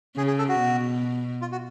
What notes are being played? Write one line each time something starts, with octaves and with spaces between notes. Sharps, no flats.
C#3 G#4
G#4
A4
F#4
B2
F4
F#4